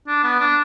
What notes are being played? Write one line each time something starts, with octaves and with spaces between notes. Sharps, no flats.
D4
B3
D4